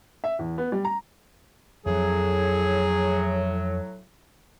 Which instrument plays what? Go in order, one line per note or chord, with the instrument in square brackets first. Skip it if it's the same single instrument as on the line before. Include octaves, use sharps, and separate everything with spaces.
[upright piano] E5
E2
B3
G3
A#5
[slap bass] F2 F3 [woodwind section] A2 F#3 [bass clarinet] G#4